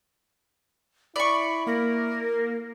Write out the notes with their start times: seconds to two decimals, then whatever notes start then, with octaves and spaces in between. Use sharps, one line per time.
1.16 E4 D5 B5 C#6
1.67 A#3 A#4